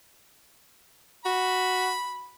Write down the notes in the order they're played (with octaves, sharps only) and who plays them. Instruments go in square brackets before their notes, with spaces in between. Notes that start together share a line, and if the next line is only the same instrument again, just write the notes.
[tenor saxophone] F#4 [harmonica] B5